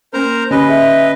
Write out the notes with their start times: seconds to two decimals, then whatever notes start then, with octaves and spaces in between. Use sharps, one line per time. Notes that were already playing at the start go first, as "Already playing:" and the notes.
0.13 A#3 C#4 A#4 C5 A#5
0.51 D3 C#4 G4 B4 D#5 B5
0.68 G#4 E5